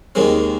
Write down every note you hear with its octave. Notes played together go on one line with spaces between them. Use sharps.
D#2 D#3 G#3 C4